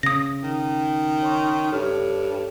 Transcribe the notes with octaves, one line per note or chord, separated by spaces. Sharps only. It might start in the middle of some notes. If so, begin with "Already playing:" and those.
C#3 D#6 A#6
D#3
C#5 C6 C#6
G2 A4 C#5 F6